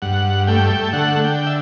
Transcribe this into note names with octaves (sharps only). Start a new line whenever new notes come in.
G2 F#5
A3 G5
D3 F#5
G5
E5